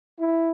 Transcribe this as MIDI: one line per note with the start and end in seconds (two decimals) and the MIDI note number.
0.18 0.50 64